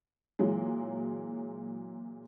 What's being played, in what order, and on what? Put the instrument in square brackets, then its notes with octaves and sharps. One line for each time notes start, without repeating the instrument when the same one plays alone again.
[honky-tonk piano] A#2 E3 F#3 G#3